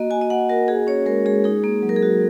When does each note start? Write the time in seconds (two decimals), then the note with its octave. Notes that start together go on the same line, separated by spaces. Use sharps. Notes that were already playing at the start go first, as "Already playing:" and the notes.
Already playing: A#3 F#4 D#5
0.11 F#4 G#5
0.21 D#5
0.30 A#3 F#5
0.49 F#4 A#4
0.68 F#4 G#4
0.87 C#4 C#5
1.06 G#3 A#4
1.26 G#3 G#4
1.44 D#4 G#4
1.64 A#3
1.82 F#3
1.89 A#4
1.96 G#4
2.03 F#4